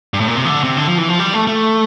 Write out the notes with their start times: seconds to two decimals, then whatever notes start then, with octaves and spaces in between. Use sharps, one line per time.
0.14 G2
0.20 A2
0.28 A#2
0.35 C3
0.45 E3
0.49 D3
0.64 C3
0.77 D3
0.88 F3
0.98 E3
1.09 F3
1.19 G3
1.34 A3
1.47 A3